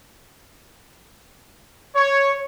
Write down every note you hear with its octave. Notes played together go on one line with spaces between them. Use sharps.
C#5